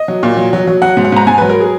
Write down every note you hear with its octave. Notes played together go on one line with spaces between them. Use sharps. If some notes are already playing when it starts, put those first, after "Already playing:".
Already playing: D#5
F#3
A#2
F#3
F#3
F#3
F#3 F#5
G#2
F#5
G#2 A#5
G#2 G#5
F#3 B4
A#4
G#4